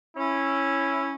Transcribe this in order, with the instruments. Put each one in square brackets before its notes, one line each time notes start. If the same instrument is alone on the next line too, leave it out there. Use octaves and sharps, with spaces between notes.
[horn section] C#4 E4